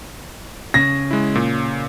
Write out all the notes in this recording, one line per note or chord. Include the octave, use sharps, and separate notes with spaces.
C#3 A#6
G#3 E4
A#2